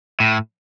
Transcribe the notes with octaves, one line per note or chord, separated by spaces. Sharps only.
A2